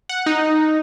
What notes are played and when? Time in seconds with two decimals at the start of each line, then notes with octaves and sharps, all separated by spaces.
0.09 F#5
0.26 D#4